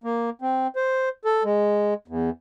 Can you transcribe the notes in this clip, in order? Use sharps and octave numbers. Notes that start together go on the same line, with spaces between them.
A#3
C4
C5
A4
G#3
E2